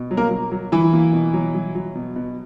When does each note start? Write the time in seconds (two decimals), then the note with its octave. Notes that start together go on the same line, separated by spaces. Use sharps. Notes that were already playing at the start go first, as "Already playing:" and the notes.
Already playing: B2
0.11 F#3
0.17 A#3 A#4
0.31 F#3
0.52 F#3
0.72 E3 F#3 E4
0.93 A#3
1.13 B2
1.34 F#3
1.54 F#3
1.75 F#3
1.95 B2
2.16 B2